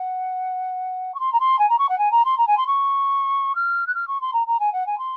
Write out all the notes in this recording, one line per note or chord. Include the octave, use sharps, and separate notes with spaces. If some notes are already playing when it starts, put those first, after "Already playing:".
Already playing: F#5
C#6
C6
A#5
C6
G#5
A#5
C#6
F#5
G#5
A#5
C6
A#5
G#5
C6
C#6
F6
F#6
F6
C#6
C6
A#5
A#5
G#5
F#5
G#5
C6